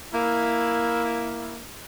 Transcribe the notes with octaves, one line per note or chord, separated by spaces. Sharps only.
A#3 E4